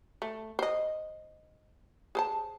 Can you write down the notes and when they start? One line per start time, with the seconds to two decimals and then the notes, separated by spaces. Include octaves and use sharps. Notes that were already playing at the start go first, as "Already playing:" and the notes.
0.22 A3
0.59 C5 D#5
2.15 G#4 C5 A5